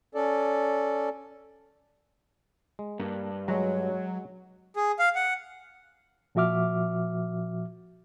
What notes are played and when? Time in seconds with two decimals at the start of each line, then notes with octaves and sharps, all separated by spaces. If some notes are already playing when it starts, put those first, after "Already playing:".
0.15 C#4 A4 D5
2.79 G#3
3.00 G2 A#3
3.48 F#3 G#3 F#4 C#5 A#5
4.76 G#4
4.99 F5
5.15 F#5
6.35 A#2 F3 F#4 E5 D6 F6